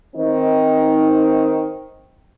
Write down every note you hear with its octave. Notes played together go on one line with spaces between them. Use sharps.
D#3 C4 D#4